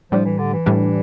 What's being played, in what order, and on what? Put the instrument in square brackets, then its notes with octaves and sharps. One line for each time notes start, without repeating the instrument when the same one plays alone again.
[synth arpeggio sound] A2 G3 D4 [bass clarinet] F3
[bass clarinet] E3
D3
E3
[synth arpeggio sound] A2 G3 D4